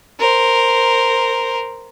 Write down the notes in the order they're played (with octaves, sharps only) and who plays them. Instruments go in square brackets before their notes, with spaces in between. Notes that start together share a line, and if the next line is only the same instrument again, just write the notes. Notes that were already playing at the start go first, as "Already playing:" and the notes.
[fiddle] A#4 C5